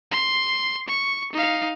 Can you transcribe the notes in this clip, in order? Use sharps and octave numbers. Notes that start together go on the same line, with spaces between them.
C6
C#6
D#4 F5